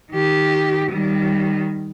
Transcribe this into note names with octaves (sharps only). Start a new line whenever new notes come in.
D#3 G4
D#3 G3